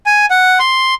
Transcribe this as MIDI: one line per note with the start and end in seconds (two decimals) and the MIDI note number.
0.06 0.26 80
0.30 0.59 78
0.60 0.94 84